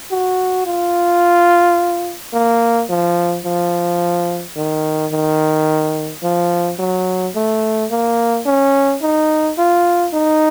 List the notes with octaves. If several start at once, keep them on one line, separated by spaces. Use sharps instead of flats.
F#4
F4
A#3
F3
F3
D#3
D#3
F3
F#3
A3
A#3
C#4
D#4
F4
D#4